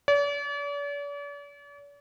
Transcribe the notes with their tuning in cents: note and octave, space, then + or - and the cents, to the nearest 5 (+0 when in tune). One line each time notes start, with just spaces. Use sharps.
D5 -45